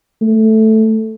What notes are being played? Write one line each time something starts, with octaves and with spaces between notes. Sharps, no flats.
A3